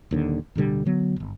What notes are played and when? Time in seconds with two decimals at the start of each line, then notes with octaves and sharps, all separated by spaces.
0.11 D#1 D#2 D3
0.55 D1 B2 D3 G3
0.85 D3 F#3 B3
1.16 D1 G1